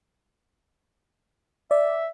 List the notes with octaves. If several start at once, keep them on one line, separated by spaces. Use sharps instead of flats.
D5 E5